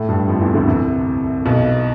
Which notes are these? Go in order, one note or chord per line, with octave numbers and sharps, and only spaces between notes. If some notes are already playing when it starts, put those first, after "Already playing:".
Already playing: A2 A3
G2 G3
F2 F3
E2 E3
D2 D3
C2 C3
B1 B2